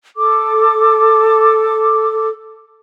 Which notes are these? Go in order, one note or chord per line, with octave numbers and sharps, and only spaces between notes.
A4 D6